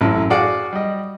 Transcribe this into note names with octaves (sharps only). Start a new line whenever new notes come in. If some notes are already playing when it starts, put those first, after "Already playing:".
A1 F#2 E4
F#4 G#4 D5 F5 F#5
G3 D#5